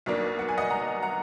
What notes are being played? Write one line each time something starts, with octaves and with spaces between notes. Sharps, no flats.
B1 B2 A#3 D4
F#5
G#5
D#5 F#5
F#5 A#5
F#5 A#5